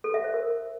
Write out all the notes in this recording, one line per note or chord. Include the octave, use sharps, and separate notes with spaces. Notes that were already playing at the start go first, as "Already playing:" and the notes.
A4
E5
C5
A#4